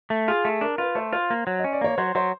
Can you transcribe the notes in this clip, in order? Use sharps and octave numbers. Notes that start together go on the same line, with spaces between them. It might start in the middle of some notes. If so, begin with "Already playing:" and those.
A3
F4 G#4
A3
D4 A#4
F4 B4
A3 C5
F4 C5
A#3
F#3
D#5
C#4
D5
A#3 C#5
F#3 C5
F#3 C5